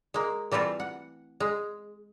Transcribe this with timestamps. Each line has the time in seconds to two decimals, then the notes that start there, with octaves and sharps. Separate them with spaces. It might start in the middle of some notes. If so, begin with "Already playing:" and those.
0.14 G#3 A#3
0.52 E3 G3 A3 C4 F4
0.80 F#5
1.40 G#3